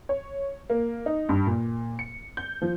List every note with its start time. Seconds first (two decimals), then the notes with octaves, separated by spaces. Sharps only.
0.09 C#5
0.70 A#3
1.06 D#4
1.29 G2
1.46 A#2
1.99 C#7
2.37 G6
2.62 F3